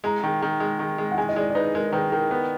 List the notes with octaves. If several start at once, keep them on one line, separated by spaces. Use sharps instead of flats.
G#3 A#5
D#3
D#3
G#3
D#3
G#3
F#5
G#3 G#5
D#5
G#3 D5
D5
D#4 B4
G#3 A#4
D#3 B4
D#3 A#4
B3